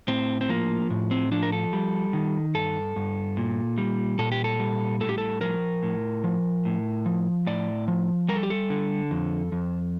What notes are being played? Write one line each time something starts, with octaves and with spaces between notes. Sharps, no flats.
A2 C4
C4
F3 A#3
A2
C4
F3 D4
A#4
A4
G3
D#3
G2 A4
G2
A#2
G3
A#2 A4
G4
A4
G3
A2 A4
G4
A4
F3 A#4
A2
F3
A2
F3
A2 D5
F3
G3 A#4
A4
G4
A4
D3
F2
F2